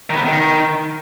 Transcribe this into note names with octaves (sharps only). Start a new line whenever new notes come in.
D#3
B3
C3
D#3